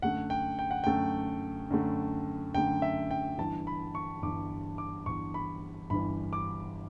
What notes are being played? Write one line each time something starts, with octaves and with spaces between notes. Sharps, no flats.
F#2 D3 A3 F#5
G5
G5
F#5
F#2 D3 A3 G5
F#2 D3 A3
F#2 D3 A3 G5
E5
G5
G1 G2 E3 A5
B5
C#6
G1 G2 E3 D6
D6
G1 G2 E3 C#6
B5
G1 G2 E3 B5
D6